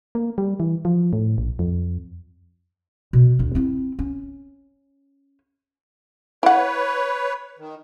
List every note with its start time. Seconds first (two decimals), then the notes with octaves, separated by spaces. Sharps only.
0.15 A#3
0.38 G3
0.60 E3
0.85 F3
1.13 A2
1.38 A#1
1.59 F2
3.13 B2
3.39 D2 D4
3.55 C4 E4
3.99 C#4
6.43 E4 B4 C#5 F#5
7.59 D#3